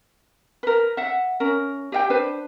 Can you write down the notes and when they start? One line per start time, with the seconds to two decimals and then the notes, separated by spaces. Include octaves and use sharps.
0.63 A#4 B4
0.97 E5 F#5
1.40 C#4 A#4
1.92 G4 E5 G5
2.10 D4 B4 C5